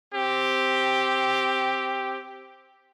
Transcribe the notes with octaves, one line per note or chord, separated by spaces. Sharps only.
C4 G4